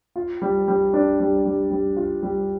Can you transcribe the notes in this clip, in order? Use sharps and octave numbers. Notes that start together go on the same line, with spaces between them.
F4
G3
G3
D4
G3
G3
G3
F4
G3